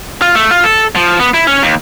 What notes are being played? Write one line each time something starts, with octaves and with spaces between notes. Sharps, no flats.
F4
A3
F4
A4
F3
B3
E4
C#4
D#2